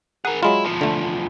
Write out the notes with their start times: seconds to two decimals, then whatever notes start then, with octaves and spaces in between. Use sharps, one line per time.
0.25 G#4 A#4 F#5
0.43 F#3 G#3 E4 F4
0.65 E2 F3
0.81 D3 A3